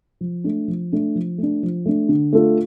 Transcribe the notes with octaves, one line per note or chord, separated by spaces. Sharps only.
F3
A3 D4
F3
A3 D4
F3
A3 D4
F3
A3 D4
D3
A3 D4 F4 A4